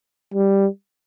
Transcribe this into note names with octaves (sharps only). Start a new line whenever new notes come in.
G3